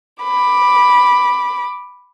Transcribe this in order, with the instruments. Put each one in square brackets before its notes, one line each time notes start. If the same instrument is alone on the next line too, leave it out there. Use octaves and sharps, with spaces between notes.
[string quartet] B5 D6